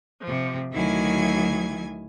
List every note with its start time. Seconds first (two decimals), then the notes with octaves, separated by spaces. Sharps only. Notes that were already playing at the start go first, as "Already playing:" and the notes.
0.23 C3 F3
0.72 D2 D#3 F#3 E4 G#5 G#6